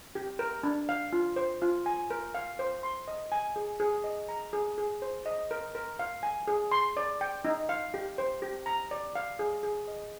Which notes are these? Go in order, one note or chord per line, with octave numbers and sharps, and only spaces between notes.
G4
A#4
D4
F5
F4
C5
F4
G#5
A#4
F5
C5
C6
D#5
G#5
G#4
G#4
D#5
A#5
G#4
G#4
C5
D#5
A#4
A#4
F5
G#5
G#4
C6
D5
G5
D#4
F5
G4
C5
G4
A#5
D5
F5
G#4
G#4
D#5